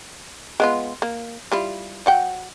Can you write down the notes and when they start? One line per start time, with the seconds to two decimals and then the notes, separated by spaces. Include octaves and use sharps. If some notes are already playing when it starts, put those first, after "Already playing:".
0.60 G#3 B3 F4
1.02 A#3
1.52 G3 E4 F4
2.06 F#3 F#5 G5